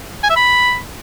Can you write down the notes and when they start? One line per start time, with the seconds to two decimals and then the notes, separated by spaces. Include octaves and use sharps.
0.23 G#5
0.30 E5
0.36 B5